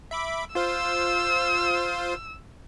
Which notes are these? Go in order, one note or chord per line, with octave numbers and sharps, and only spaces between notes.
E5 B5 D6
F4 C5 F5 E6